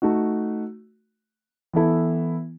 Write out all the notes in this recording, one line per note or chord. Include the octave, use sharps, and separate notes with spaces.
A3 D#4 F#4
E3 B3 E4 A4